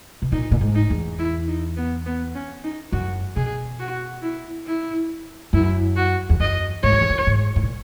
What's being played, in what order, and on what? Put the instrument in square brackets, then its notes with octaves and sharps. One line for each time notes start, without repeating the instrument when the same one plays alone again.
[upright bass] B2
[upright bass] A#2 [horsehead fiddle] D#4
[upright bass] A#2
G#2
[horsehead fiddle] D#4
[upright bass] E2
[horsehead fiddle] E4
D#4
B3
B3
C#4
D#4
[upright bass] F#2 [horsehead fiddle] F#4
[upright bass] B2 [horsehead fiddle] G#4
[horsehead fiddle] F#4
E4
E4
[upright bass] F#2 [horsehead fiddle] E4
[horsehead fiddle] F#4
[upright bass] E2
[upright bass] F#2 [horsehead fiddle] D#5
[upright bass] G#2 [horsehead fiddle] C#5
[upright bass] F#2
E2
F#2
G#2
G#2
A#2